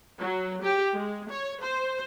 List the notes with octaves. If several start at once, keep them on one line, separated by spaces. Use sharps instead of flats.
F#3
G4
G#3
C#5
C5